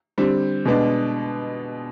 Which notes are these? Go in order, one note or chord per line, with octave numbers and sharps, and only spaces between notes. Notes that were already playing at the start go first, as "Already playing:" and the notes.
D3 G3 C4
B2 G#3 B3 D4